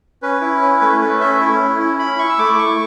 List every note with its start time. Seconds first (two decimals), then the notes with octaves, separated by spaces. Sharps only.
0.22 C#4 B4
0.41 E4
0.61 C#4
0.81 A3 B4
1.00 A3 B4
1.21 C#4 E5
1.40 E4
1.59 C#4
1.79 E4
1.99 E4 B5
2.19 E4 C#6
2.29 E6
2.38 A3 D6
2.58 A3 C#6